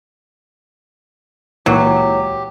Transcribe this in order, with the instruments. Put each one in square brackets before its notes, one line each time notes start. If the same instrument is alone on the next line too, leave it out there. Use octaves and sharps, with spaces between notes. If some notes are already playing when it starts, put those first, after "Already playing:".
[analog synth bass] C#2 [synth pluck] A#2 E3 [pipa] F#3 [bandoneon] G4